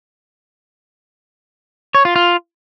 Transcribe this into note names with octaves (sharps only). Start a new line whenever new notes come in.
C#5
F4
F4